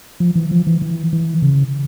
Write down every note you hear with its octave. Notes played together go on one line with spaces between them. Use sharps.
F3
E3
F3
E3
E3
E3
C#3